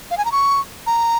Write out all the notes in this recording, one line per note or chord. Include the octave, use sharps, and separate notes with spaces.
F5
G#5
A#5
C#6
A#5